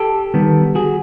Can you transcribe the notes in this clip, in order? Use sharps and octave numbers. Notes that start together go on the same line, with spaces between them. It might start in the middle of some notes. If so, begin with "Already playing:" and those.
Already playing: G4 A4
D#3 G3 B3
F#4 G#4